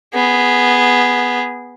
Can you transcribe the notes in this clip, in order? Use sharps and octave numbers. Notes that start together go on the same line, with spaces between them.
B3 G#4